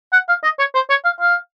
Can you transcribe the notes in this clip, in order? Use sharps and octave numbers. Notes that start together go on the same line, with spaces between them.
F#5
F5
D#5
C#5
C5
C#5
F5
F5